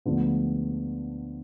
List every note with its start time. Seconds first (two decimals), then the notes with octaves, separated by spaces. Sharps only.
0.05 D2 D3 F3 G#3 B3